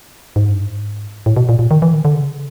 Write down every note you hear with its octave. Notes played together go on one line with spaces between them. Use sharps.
G#2
G2
G#2
A2
B2
A#2
A#2
D#3
E3
D#3
D3
C#3